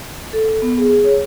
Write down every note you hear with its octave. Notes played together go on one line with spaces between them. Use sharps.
A4
B3
G#4
G#4
C#5